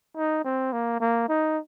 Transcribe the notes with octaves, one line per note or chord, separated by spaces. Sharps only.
D#4
C4
A#3
A#3
D#4